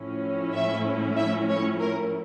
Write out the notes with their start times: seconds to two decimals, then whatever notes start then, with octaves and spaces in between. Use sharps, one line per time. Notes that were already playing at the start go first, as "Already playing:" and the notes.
Already playing: A2 F3 A3 C#4 E4
0.54 E5
1.17 E5
1.49 C#5
1.80 A#4